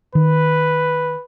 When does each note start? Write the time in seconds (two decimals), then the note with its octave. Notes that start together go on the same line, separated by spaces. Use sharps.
0.15 D#3 B4